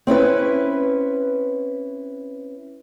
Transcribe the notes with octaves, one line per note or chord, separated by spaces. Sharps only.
C4 C#4 E4 B4